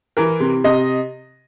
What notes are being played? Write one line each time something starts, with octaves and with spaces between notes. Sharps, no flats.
E3 A#4
C3
C3 D#5